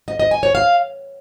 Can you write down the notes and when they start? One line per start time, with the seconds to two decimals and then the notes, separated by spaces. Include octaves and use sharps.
0.08 D#5
0.19 D#5
0.31 G#5
0.43 C#5
0.55 F5